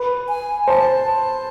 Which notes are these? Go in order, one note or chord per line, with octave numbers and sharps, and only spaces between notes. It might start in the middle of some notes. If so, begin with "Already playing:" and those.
Already playing: B4
G#5
C5 A5